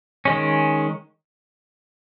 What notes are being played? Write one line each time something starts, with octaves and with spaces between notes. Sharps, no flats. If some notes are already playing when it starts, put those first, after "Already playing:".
D#3 G#3 C#4